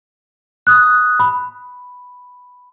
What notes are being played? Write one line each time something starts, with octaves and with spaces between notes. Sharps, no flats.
D#6 F#6
B5